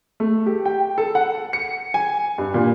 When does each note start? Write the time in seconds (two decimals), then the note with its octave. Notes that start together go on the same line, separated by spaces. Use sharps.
0.20 A3
0.46 G4
0.65 G5
0.98 A4
1.15 F#5
1.53 C#7
1.94 G#5
2.38 G2
2.54 A#2